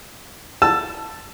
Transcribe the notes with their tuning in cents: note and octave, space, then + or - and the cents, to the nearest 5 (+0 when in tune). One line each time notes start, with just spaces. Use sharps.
A5 +0 E6 +20